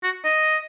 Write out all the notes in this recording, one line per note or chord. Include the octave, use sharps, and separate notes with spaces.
F#4
D#5